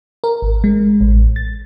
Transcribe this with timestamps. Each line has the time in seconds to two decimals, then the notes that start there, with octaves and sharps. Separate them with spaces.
0.24 A#4
0.42 G#1
0.64 G#3
1.01 A1
1.36 A6